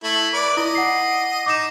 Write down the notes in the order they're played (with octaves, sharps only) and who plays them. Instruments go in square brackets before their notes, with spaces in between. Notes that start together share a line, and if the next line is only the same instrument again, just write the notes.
[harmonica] A3 E4
B4 D5 D6
[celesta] E4 [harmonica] D#5
[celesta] F#5 C7
[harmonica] D#4 [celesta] D6 A#6 E7